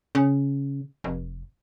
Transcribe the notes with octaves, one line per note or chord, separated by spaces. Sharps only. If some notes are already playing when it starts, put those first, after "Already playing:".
C#3
F1